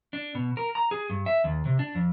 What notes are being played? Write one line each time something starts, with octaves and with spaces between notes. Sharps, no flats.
D4
B2
A#4
A#5
G#4
G2
E5
D#2
C3
D4
F2